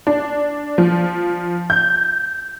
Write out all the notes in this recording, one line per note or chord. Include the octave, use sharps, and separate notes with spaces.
D4
F3
G6